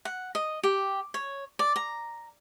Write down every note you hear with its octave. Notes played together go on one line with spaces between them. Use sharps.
F#5
D#5
G4
C#5
D5
A#5